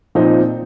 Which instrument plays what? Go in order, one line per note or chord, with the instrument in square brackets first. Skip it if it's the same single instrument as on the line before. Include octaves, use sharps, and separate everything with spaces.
[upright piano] A#2 F3 C4 D#4